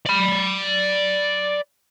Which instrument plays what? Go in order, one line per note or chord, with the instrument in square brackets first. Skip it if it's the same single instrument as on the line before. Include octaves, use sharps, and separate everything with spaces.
[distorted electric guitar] D5 B5